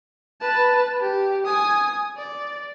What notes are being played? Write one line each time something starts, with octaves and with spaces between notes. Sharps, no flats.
B4 A5
G4
G#5 D#6
D5